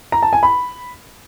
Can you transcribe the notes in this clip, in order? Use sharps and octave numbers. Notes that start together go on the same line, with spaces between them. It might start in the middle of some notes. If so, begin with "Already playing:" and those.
A#5
A5
G#5
B5